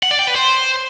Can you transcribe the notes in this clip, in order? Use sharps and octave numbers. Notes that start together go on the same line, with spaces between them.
F#5
D5
G5
B4
C5